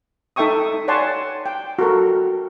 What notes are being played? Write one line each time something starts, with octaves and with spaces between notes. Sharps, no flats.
D#4 A4 E5 G5 C#6 D#6
C#5 D5 F#5 G#5 A5 C6
G5
F#4 A4 A#4